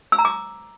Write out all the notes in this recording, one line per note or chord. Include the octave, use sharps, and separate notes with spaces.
E6
A#5
D6